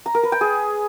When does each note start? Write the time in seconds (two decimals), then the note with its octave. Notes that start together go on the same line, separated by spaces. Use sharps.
0.06 A#5
0.15 A#4
0.23 B4
0.32 G5
0.41 G#4